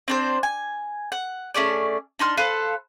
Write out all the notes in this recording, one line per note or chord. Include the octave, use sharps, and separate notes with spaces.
C4 D4 C5
G#5
F#5
A3 C#4 G#4 D5
D4 D#4 C6 F6
A4 B4 C5 F5